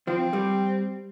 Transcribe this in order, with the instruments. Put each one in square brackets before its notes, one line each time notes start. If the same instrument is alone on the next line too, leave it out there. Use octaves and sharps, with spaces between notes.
[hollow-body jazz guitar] F3 [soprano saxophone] C4
[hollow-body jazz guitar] G3